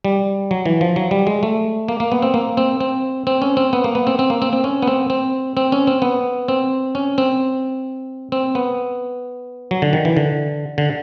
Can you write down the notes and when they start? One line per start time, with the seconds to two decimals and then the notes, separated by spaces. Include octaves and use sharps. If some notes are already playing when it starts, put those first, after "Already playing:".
0.05 G3
0.51 F#3
0.66 E3
0.81 F3
0.96 F#3
1.11 G3
1.27 G#3
1.43 A3
1.88 A#3
2.00 A#3
2.12 B3
2.22 C4
2.34 A#3
2.57 C4
2.80 C4
3.27 C4
3.42 C#4
3.57 C4
3.73 B3
3.84 A#3
3.95 B3
4.07 C4
4.19 C4
4.30 A#3
4.42 C4
4.53 C4
4.64 C#4
4.82 B3
4.87 C4
5.10 C4
5.57 C4
5.72 C#4
5.87 C4
6.02 B3
6.48 C4
6.95 C#4
7.18 C4
8.32 C4
8.55 B3
9.71 F#3
9.82 D3
9.93 D#3
10.05 E3
10.17 D3
10.78 D3